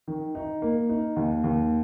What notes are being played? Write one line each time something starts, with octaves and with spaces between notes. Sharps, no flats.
D#3
D#4
A#3
D#4
D#2
D#2